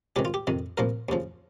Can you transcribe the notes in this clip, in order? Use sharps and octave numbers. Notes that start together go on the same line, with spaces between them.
C#2 C3 D#3 G4
F4
G4
F2 C3 D#3
C2 A#2 F3 A#4
D#2 C#3 F3